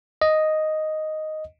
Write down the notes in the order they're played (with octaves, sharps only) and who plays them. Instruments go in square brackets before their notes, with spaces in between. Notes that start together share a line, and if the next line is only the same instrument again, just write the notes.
[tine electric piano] D#5